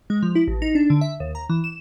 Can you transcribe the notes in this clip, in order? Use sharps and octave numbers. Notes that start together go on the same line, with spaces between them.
G#3
F3
E4
A1
D#4
D4
D3
E5
D#2
A#5
E3
E7